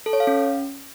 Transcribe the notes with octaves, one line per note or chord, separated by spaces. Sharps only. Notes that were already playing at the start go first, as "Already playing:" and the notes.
A4
C#5
F5
C#4